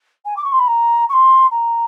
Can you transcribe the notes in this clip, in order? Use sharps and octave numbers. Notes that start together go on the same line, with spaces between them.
G#5
D6
C#6
C6
B5
A#5
C#6
C6
A#5